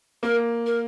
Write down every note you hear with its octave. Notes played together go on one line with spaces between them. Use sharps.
A#3 A#4
A#4